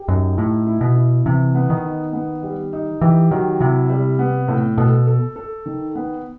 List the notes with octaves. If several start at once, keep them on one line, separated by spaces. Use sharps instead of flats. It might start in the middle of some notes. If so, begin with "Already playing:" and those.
Already playing: G4
F#2 D#4
A2 E4
E4
B2
E4
C3 E3
B3
D#3
D#4
B3
G3
D#4
E3 G4
D#3 F#3
C3 E4
G3
B3
A2
B2 A4
A4
A4
D#3
B3